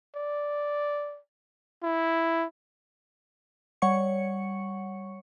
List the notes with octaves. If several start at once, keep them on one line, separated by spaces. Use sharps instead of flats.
D5
E4
G3 C#5 F#5 C#6 C#7